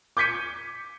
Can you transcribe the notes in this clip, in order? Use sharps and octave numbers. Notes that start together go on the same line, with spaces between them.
D6 G6 G#6 B6 C#7 D#7